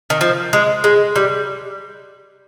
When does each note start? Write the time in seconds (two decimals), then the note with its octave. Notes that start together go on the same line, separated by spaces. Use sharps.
0.10 D#3
0.21 F3
0.53 G#3
0.84 G#3
1.16 G3